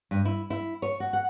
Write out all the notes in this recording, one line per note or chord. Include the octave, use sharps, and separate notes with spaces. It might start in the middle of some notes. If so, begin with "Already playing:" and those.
G2
E4
E4
C#5
F#4
F#5